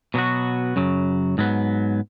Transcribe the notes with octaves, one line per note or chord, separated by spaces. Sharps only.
B2 F#3 B3 F#4
F#2 C#3 F#3
G#2 F#3 B3